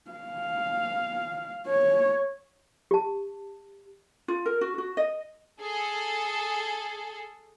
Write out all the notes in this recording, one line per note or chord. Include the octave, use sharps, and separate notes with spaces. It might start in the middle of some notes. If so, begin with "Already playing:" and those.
F5
C#5
G4 A5
F4
A#4
F#4
F#4
D#5
G#4 A4